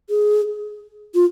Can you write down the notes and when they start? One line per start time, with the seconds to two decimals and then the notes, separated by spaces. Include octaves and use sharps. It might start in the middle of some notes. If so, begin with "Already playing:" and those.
0.10 G#4
1.14 F4